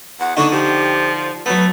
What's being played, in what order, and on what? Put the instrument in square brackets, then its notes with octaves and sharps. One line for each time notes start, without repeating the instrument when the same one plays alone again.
[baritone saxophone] E2 [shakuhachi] F#5
[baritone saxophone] B2 [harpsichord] D3 D4 D#4 [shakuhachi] C#6
[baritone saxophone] F3 [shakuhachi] G4
[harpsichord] F#3 B3 [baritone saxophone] A3 [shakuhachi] B4